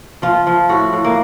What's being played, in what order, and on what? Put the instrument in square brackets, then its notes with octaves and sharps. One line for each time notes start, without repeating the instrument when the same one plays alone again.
[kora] F3 F4
F3
A2 F#4
A2
A#3